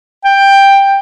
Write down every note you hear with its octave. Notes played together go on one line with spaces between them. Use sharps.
G5